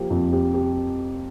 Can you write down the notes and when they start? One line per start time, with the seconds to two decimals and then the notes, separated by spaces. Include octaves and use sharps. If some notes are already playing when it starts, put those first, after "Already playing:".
Already playing: F3 A#3 G4
0.10 F2
0.33 G4
0.54 G4